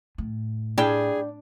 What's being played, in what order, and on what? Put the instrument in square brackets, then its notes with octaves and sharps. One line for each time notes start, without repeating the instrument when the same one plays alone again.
[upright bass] A2
[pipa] G3 E4 G5 [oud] D4 [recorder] G#4